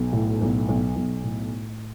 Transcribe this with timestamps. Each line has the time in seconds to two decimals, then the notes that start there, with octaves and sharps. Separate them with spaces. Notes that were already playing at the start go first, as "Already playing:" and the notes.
Already playing: B1
0.13 A2
0.41 B1
0.69 B1
0.96 B1
1.24 A2